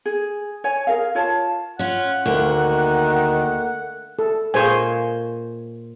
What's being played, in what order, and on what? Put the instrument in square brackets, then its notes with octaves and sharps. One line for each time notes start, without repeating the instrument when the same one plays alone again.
[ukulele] G#4
C#5 G#5
G#4 A#4 F5
F4 C#5 F5 A5
[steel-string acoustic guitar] C#4 F4 [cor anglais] F#5
[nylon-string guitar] D2 [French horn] D#3 [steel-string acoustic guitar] A#3
[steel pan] A4
[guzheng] A#2 A#4 C#5 [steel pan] G#4 C5 G#5